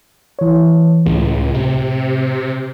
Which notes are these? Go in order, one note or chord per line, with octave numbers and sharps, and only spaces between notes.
E3 C#5
C#2 A2
C3